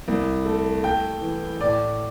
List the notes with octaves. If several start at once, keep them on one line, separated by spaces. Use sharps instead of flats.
C2
A3
A3 G5
E3
A2 D5